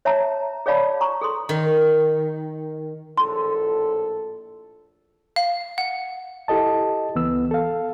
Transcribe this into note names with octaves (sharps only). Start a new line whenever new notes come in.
C#5 E5 A5 A#5
G#4 C#5 D5 F5 A5 B5
A#5 C#6
G#4 A4 C6
D#3
A#1 A2 A4 C6
F5
F#5
E4 G4 A4 D#5 A5
C#2 E3 B3 E6
A4 F5